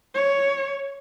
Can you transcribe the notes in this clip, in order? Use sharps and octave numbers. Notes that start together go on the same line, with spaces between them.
C#5